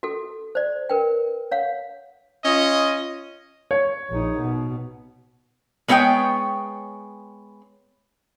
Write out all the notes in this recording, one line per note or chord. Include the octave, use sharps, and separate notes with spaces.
F#4 A4
C5 D5
A#4 B4 G5
C#5 F5 F#5
C#4 F4 D#5
C#5
A#1 D#4
B2
G#3 B3 C#5 D#5 G5